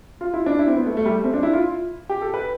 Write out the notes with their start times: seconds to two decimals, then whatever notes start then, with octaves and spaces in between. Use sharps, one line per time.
0.21 F4
0.34 E4
0.46 D4
0.59 E4
0.68 C4
0.77 B3
0.86 A3
0.97 A3
1.06 G3
1.15 A3
1.24 C4
1.33 D4
1.43 E4
1.53 F4
2.09 G4
2.21 A4
2.34 B4